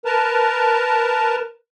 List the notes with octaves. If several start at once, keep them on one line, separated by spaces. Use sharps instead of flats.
A#4 B4 A5 A#5